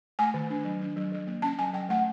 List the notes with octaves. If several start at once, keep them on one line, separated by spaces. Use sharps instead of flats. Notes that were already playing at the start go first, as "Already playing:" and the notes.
A3 G#5
D#3
D4
F#3
D4
F#3
F#3
A#3
C#4 A5
F#3 G#5
F#3 G5
A3 F#5